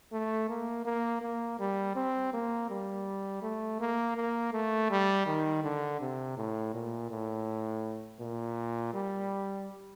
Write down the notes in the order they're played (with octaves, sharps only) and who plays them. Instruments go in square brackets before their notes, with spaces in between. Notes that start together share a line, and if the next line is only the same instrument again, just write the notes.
[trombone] A3
A#3
A#3
A#3
G3
C4
A#3
G3
A3
A#3
A#3
A3
G3
D#3
D3
C3
A2
A#2
A2
A#2
G3